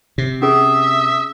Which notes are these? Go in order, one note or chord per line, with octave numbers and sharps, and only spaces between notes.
C3
C#4 G#4 E5 D#6